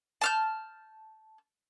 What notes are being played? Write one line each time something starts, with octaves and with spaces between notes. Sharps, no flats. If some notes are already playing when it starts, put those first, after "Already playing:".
A5 F6 G6